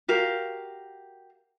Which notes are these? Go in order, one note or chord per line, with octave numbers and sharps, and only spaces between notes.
F#4 G4 A#4 F5